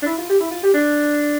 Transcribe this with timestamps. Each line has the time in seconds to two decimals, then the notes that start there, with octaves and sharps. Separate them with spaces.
0.02 D4
0.06 E4
0.18 F4
0.29 G4
0.40 E4
0.51 F4
0.63 G4
0.74 D4